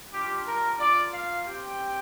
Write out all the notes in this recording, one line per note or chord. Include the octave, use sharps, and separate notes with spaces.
G3 D4 F4 G4
A#4
A#3 F4 D5
F5
C4 G4 G5